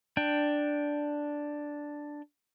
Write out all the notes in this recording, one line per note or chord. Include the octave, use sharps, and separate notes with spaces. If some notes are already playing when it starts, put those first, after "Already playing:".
D4 G5